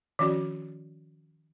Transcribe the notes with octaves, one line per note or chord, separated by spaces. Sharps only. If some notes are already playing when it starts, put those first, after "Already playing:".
D#3 F3 C#4 F#4 D5